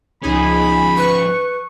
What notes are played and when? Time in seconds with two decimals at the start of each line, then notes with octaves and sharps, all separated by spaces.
0.23 C#2 F3 C#4 D#4 G#4 B5
0.97 B4 C#6